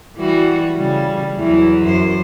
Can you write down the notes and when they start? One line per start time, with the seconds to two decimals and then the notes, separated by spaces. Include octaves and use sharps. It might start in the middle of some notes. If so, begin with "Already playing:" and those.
0.17 E3 G3 F#4
0.76 C#3 G3
1.36 E2 E3 F#3
1.85 F#2 C5